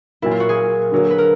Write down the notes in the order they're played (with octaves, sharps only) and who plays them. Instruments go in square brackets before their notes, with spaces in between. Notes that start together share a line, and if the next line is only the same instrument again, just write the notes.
[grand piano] A#2 F#3 A#3 [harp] E4
[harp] F4
F#4
G#4
[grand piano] D3 F#3 A#3
[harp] B4
A#4